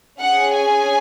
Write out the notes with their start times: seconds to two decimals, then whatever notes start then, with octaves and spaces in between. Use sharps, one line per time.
0.18 C#4 G#4 F#5
0.54 G#5